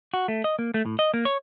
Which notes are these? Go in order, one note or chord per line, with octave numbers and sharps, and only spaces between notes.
F#4
A3
D#5
A#3
A3
A2
D#5
A#3
C#5